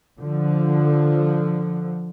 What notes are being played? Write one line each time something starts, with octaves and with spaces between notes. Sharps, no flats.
D3 F3